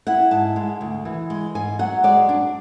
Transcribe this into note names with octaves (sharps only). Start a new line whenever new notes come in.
E4 F#5
G#2 A5
G#3
D2
E3
G#3
G#2 G#5
F#3 F#5
G#3 D5
D4